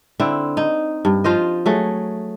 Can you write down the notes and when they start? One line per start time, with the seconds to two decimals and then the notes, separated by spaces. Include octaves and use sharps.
0.20 D3 C4 E4
0.57 D#4
1.05 G2
1.24 F3 F4 C5 D#5
1.66 F#3 A3 G#4